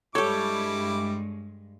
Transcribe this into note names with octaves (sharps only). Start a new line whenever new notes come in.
G2 G3 G#3 E4 G4 A4 C#5 D6